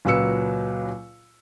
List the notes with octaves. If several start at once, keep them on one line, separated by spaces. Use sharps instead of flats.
C#2 A#2 F#3 B4 E6 C#7